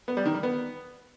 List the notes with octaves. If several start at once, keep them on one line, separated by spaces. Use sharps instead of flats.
B3
G3
D#3
G3
B3